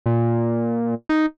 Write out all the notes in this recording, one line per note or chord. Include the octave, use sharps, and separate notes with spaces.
A#2
D#4